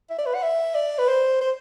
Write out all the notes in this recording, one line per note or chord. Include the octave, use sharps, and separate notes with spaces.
E5
D5
B4
F#5
E5
D5
B4
C5
C5